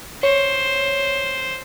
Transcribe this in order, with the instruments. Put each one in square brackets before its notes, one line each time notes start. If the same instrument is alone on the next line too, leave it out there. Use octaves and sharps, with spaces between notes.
[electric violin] C5 [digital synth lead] C#5